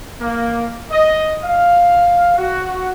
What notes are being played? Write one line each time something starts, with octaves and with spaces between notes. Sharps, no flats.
A#3
D#5
F5
F#4